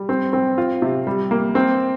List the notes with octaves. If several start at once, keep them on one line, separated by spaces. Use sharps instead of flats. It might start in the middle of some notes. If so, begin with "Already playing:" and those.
Already playing: G3
C4
C4
F4
C3
G3
A#3
C4